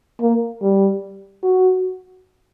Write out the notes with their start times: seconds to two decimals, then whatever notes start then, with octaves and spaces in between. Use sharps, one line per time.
0.21 A#3
0.62 G3
1.43 F#4